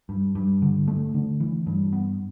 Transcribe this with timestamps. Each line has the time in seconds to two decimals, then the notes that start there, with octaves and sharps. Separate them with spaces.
0.09 G2
0.35 G2
0.62 D3
0.88 A3
1.14 D3
1.40 E3
1.66 G2
1.93 B3